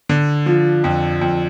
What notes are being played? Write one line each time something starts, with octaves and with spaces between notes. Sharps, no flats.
D3
F3
F2
F2